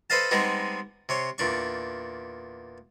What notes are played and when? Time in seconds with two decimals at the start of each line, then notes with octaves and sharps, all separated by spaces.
0.10 A4 B4 C5 D#5 F5 A5
0.31 G3 G#3 B3 C4 D#4 G#4
1.09 C3 C#5 C6
1.38 E2 A#2 D4 C#6